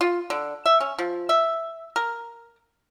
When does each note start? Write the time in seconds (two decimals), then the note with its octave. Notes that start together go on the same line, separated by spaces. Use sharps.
0.01 F4
0.30 D3
0.66 E5
0.80 C#4
0.99 F3
1.29 E5
1.96 A#4